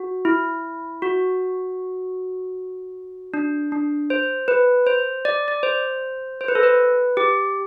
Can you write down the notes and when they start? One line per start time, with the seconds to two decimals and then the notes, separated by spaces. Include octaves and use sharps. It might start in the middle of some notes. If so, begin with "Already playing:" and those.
Already playing: F#4
0.25 E4
1.02 F#4
3.34 D4
3.72 D4
4.10 C5
4.48 B4
4.87 C5
5.25 D5
5.48 D5
5.63 C5
6.41 C5
6.48 B4
6.55 A4
6.63 B4
7.17 G4